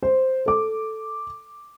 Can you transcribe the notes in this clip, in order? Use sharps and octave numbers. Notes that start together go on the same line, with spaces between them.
C5
A4 D6